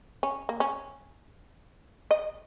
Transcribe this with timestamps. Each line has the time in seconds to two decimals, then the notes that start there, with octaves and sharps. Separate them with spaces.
0.23 C#4
0.49 A#3
0.60 C#4
2.11 D#5